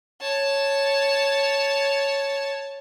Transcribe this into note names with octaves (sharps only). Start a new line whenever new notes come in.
C#5 A5